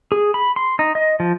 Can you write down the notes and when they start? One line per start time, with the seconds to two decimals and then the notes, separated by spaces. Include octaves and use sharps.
0.12 G#4
0.34 B5
0.56 C6
0.79 D#4
0.95 D#5
1.20 F3